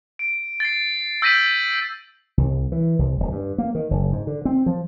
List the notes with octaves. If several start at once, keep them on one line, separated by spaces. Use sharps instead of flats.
D7
A6 C7
E6 G6 A#6 B6 D#7 F#7
C2
E3
C2
D1
G2
A#3
D#3
F#1
G#2
D3
C4
F3